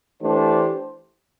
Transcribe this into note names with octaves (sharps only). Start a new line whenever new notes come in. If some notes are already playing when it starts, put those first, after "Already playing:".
E3 A3 D4 G4 C5